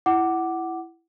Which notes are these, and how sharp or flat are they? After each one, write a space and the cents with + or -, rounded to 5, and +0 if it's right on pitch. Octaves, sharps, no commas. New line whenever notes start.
E4 +10 F#5 +15 D6 +0